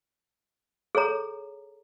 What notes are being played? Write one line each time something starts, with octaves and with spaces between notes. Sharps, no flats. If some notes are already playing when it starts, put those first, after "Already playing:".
G#4 A4 C#5 A#5